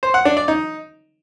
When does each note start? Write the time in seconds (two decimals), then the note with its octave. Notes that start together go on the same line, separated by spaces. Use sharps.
0.03 C5
0.14 F#5
0.25 D4
0.37 D5
0.48 D#4